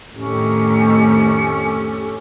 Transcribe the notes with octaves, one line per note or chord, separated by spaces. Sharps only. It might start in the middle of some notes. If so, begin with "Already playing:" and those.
F2 A2 D#3 C#4 G4 A4